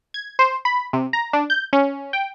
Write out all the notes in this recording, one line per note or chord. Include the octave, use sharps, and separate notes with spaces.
G#6
C5
B5
C3
A#5
D4
G6
C#4
G5